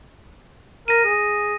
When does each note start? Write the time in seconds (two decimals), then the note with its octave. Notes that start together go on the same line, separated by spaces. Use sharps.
0.88 A#4 A#6 D#7
1.04 G#4